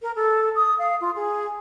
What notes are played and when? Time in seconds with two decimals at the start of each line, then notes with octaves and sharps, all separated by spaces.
0.01 A#4
0.15 A4
0.55 D#6
0.78 F5
1.00 F4
1.15 G#4